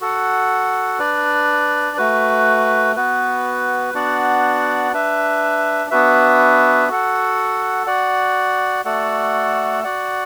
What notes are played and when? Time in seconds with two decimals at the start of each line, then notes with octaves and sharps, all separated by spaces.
0.01 F#4 A4 F#5
0.99 D4 B4 D5
1.97 A3 F#4 B4
2.96 B3 F#4 B4
3.94 B3 D4 F#4 D5 F#5
4.92 D4 B4 E5
5.90 B3 D4 F#4 B4 E5
6.88 F#4 A4 F#5
7.87 F#4 D5 F#5
8.85 A3 F#4 A4 D5 F#5
9.84 F#4 D5 F#5